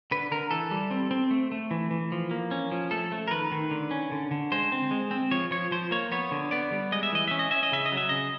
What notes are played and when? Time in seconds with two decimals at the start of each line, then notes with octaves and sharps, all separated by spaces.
0.11 D3 B4
0.31 D3 A#4
0.51 E3 A4
0.71 G3
0.91 C4
1.11 C4
1.31 A3
1.52 A3
1.71 E3
1.91 E3
2.12 F3
2.31 A#3
2.51 C#4
2.71 F3
2.91 A3 A4
3.12 A3
3.28 A#4
3.31 D#3 B4
3.52 D#3
3.71 D3
3.91 C#4
4.12 D3
4.31 D3
4.52 G#3 C5
4.72 C4
4.91 G#3
5.11 C4
5.31 F3 C#5
5.51 F3 C#5
5.71 F3 C5
5.91 A#3 C#5
6.12 B3 C#5
6.31 D3
6.51 B3 D5
6.72 G3
6.92 G#3 D#5
7.03 E5
7.12 E3 D#5
7.28 C#4 E5
7.39 D#5
7.51 C#4 E5
7.63 D#5
7.72 C#3 E5
7.86 D#5
7.92 F#3
7.97 E5
8.09 C#3 D#5